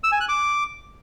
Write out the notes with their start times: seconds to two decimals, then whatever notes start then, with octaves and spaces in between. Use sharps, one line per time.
0.04 E6
0.12 G#5
0.20 F#6
0.29 D6